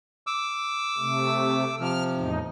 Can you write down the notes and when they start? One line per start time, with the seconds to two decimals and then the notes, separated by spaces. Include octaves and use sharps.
0.27 D6 E6
0.98 C3 A3
1.80 C3 F3 F6
2.15 E2 A2 D#4